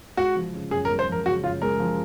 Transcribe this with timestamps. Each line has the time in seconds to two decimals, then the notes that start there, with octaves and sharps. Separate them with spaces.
0.17 G#3 F#4
0.35 F3
0.54 C#3
0.71 F#2 G#4
0.85 A#4
0.90 G#3
0.99 C5
1.08 F3 A#4
1.26 C#3 F#4
1.44 F#2 F4
1.62 G#3 A#4
1.79 F3